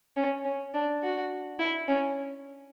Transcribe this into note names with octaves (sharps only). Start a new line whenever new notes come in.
C#4
C#4
D4
F#4
E4
C#4